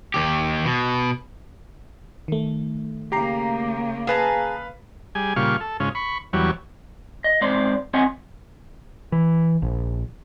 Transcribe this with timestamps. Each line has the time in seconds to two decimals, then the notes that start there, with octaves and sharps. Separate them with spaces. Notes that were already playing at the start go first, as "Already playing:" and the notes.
0.14 D#2 G4
0.66 B2
2.28 D#3 A3
3.12 C#3 A#3 G4 A#5 C7
4.07 G#4 B4 F5 A5 A#5
5.15 G3 G#4 G#5
5.36 A#2 C#3 G3 F4 F5 C#6
5.60 A4
5.80 G#2 C#3 C#4 F4
5.95 B5 C#6
6.33 E2 F#3 G3 C#5
7.24 D#5
7.41 G#2 C4 C5 D5 C6
7.94 C4 C#5 D#5 F#5 G#5
9.12 E3
9.62 A#1